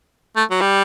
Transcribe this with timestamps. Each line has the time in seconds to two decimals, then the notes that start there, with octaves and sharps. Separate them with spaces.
0.36 A3
0.50 F#3
0.61 G3